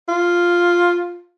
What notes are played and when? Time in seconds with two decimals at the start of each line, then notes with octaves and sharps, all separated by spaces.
0.09 F4